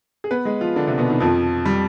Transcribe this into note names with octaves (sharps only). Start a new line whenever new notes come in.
G#4
B3 B4
G#3 G#4
F3 F4
D3 D4
C3 C4
B2 B3
D#3
F2 F3
G3